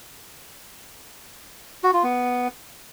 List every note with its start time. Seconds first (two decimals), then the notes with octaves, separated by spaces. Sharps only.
1.84 F#4
1.93 F4
2.03 B3